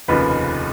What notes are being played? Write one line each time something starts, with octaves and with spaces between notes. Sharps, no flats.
F1 D#2 C#3 F3 B4